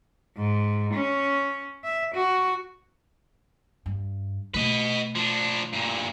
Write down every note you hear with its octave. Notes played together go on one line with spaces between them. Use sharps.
G#2
C#4
E5
F#4
G2
B2 A3 B4 D#5
F3 D4
G2 A#2